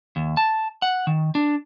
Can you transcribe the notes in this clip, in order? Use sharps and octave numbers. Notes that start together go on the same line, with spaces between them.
D#2
A5
F#5
D#3
D4